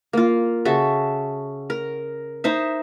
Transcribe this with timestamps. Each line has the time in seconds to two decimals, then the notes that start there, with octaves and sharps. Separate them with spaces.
0.13 A#3 F4
0.65 C#3 F#4 A4 E5
1.70 A#4
2.44 D#4 C5 E5